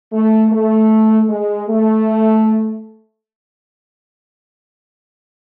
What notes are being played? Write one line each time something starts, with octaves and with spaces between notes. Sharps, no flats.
A3
A3
G#3
A3